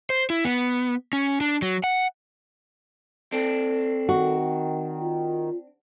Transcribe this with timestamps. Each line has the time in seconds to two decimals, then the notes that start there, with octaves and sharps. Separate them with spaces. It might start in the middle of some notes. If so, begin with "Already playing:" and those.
0.10 C5
0.30 E4
0.45 B3
1.13 C#4
1.41 D4
1.62 F#3
1.84 F#5
3.32 C4 D4 A4
4.09 D#3 F#4
5.01 F4